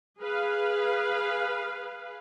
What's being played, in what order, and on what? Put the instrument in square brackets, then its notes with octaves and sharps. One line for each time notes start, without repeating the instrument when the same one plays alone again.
[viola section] G#4 B4 F5